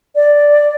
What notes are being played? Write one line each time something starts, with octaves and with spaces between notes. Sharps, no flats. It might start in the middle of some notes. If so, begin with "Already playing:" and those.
D5